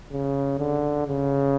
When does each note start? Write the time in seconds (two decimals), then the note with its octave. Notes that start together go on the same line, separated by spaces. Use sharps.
0.12 C#3
0.59 D3
1.07 C#3